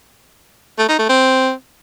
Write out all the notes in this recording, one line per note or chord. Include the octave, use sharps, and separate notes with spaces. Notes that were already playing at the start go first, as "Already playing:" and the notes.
A3
D#4
A3
C4